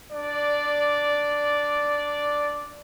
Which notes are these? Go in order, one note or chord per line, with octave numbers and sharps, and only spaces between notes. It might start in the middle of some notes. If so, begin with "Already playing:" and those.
D4 D5